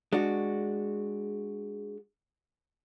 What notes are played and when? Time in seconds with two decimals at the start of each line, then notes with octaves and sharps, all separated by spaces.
0.13 G#3 D4 F#4